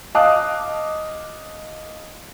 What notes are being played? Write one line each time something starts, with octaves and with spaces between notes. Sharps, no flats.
D#5 F5 A5 D6 D#6 F#6